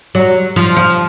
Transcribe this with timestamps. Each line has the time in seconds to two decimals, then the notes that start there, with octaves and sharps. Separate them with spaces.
0.15 F#3
0.56 F3
0.77 F3